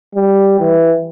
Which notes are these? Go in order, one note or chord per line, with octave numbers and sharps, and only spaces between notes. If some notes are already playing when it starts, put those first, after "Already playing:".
G3
E3